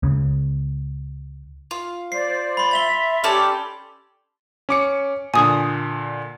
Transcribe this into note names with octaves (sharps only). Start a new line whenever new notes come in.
C#2 C#3
F4
C5 D5 C7
B5 C6
E5 A6 F7 G7
C#4 G4 A4 D5
C#4 D6 C#7
A#2 D3 G#5 D#6